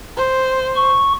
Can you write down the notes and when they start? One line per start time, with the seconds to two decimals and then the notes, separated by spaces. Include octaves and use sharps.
0.17 C5
0.76 C#6